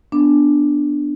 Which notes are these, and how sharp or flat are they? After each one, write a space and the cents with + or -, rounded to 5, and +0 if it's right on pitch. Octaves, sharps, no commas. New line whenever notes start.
B3 +0 D4 +0